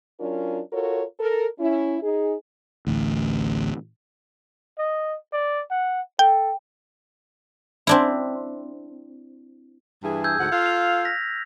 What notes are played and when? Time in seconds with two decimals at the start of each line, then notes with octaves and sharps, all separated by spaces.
0.20 F#3 C#4 D4 F4 A#4
0.73 F4 F#4 A4 A#4 C#5
1.20 A4 A#4
1.60 C#4 E4
2.02 D#4 G#4
2.87 A1 D2
4.79 D#5
5.33 D5
5.71 F#5
6.19 A4 G5
7.87 C4 D4 E4
10.03 G2 E3 G#4
10.24 E6 G6 G#6
10.38 D2 G#2 F#5
10.51 F4 A4 F5
10.66 F6 F7
11.05 A#6 B6